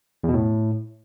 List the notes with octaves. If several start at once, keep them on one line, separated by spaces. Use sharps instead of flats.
E2
B2
A2